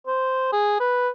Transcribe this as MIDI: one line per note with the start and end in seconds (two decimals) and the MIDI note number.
0.07 0.50 72
0.52 0.78 68
0.80 1.09 71